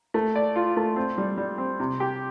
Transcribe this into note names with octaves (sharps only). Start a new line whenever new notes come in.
A3
D5
F4
A3
C4
G3
G3
C4
C3
G4